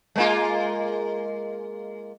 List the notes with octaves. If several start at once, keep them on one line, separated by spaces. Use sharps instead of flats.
G#3 A#3 F4